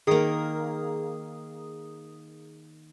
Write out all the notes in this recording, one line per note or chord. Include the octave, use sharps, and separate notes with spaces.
D#3 A#3 G#4 D#6